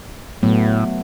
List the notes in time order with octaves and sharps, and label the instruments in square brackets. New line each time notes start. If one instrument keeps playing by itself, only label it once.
[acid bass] A2 [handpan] F#3 A3 B3